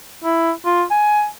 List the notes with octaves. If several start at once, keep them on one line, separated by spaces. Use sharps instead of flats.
E4
F4
G#5